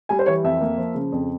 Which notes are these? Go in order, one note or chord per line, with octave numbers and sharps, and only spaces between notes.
G3 G#5
C5
E3 C#5
F2 E5
A#3
F3
C#3
F2